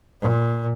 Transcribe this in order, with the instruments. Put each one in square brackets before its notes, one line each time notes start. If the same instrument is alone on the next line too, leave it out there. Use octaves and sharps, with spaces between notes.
[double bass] A#2